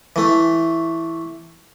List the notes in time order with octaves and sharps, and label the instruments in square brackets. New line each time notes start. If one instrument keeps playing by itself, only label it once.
[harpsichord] E3 A3